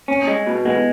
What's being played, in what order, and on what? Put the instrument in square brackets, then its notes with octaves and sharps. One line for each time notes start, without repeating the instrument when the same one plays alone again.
[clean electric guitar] C#4
G#3
B2
[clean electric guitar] G#3 [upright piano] B3